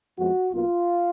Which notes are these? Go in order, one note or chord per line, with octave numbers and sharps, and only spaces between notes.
F2 F3 G#3 B3 F#4
B1 B2 A#3 F4